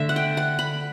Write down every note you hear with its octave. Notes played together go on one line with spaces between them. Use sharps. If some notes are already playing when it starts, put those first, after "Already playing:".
Already playing: D3 A3 E5
F#5
G5
F#5
B5